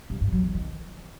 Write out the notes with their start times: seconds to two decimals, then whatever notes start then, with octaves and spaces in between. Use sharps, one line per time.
0.10 G2
0.21 G2
0.32 F#3
0.44 E3
0.55 D#3